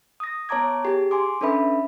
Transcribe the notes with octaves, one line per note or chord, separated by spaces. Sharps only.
D#6 A#6
B3 C#5 A5 A#5 D6 G#6
G4 G#4
G#5 C6 D6
C#4 D4 A4 B4 E5 B5